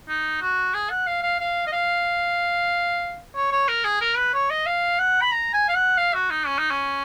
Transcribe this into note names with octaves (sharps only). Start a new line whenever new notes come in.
D#4
F#4
G#4
F#5
F5
F5
F5
D#5
F5
C#5
C#5
A#4
G#4
A#4
B4
C#5
D#5
F5
F#5
B5
A#5
G#5
F5
F#5
F5
F#4
D#4
C#4
D#4
C#4